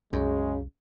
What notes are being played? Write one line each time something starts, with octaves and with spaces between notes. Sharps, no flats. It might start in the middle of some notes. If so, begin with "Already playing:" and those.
C2 F#2 C#3 G#3